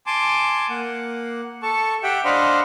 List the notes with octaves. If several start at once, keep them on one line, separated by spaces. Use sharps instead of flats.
G#5 A5 C6 D6
A#3 F#5
A4 A5 C#6
G4 E5 F#5 G5
D4 C5 D#5 F5 F#5 B5